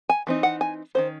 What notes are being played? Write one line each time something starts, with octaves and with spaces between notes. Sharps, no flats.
G#5
E3 C4 D#4
F#5
G#5
D#3 F#3 C#4 C5